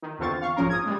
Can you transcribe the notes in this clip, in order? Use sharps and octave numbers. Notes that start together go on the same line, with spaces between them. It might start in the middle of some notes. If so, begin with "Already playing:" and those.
D#3
E2 D3 C4 F4 C#6 A6
F5 C#6
A#1 G#2 F3 C#4 A#4
D#6 G#6
G3 G#3